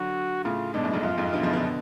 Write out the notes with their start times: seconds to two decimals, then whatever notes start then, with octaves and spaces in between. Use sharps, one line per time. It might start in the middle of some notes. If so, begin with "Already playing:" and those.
Already playing: D3 F#3 F#4
0.44 A2 C#3 F4
0.74 G#2 B2 D4
0.84 F#2 A2
0.93 F2 G#2
1.03 F#2 F4
1.18 F2 G#2
1.33 B2 D3
1.43 C#3 F3
1.53 B2 D3